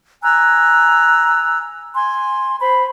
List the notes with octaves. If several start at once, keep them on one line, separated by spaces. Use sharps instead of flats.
G#5 A#5 E6 F#6
G#5 C6
C5 B5